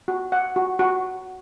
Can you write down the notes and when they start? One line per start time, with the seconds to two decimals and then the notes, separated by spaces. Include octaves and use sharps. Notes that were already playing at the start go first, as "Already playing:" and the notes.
0.08 F#4
0.32 F#5
0.56 F#4
0.79 F#4